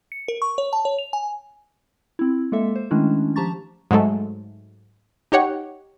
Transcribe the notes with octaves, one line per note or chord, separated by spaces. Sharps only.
C#7
A#4
C#6
C#5
A5
C#5
F7
G#5
C4 E4
G#3 A#3 A4 E5
C5
D#3 G#3 A3 C#4 D4 E4
F3 G4 A5 A#5 C#6 A6
G#2 F#3 G#3 A3
D#4 G4 C#5 F#5